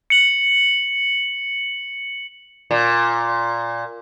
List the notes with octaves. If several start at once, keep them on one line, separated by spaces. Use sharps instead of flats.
C#7 F#7
A#2